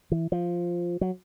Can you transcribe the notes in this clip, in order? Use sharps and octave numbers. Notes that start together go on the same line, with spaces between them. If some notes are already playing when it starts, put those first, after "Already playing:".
E3
F3
F#3